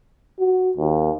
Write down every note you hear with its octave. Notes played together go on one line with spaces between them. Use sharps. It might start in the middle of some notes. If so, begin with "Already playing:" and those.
F#4
D#2